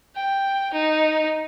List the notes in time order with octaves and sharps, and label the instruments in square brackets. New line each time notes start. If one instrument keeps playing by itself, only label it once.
[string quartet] G5
D#4